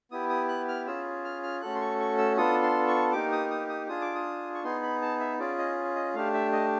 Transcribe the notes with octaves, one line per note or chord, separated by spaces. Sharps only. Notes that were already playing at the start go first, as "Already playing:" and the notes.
B3 E4 G4 D#6
D#6
F#6
F6
C#4 F4 G#4 E6
F6
F6
A3 C#4 F#4 A4 F#6
C6
C#6
C#6
E6
B3 D4 F4 A4 D#6
C6
C#6
A#3 D#4 G4 D6
D#6
D#6
D#6
D4 F4 G#4 D#6
D6
D#6
C#6
B3 D#4 G#4 C6
B5
A5
E5
C#4 F4 G#4 D5
D#5
D#5
A3 D4 G4 F5
E5
D#5